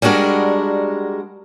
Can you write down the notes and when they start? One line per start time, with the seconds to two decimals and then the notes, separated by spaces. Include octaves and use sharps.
0.02 G3 G#3 D4 F#4 A#4